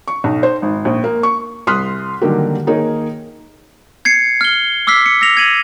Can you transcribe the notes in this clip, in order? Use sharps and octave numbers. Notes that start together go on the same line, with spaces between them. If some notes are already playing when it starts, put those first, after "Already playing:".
C#6
B1
C5
G#1
A#1
A#3
C#6
C2 C6 D#6 F6 F#6 B6
D3 D#3 F#3 G3 A#3 G4
D#3 A#3 D#4 G#4 A#4 C#5
G#6 C7 C#7
F6 G7
D6 E6 F6 B6 C7
C#7
E6 A#6 F7
G#6 D#7 F#7